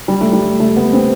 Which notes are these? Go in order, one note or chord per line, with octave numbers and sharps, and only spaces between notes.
G3
A3
G3
A3
B3
C4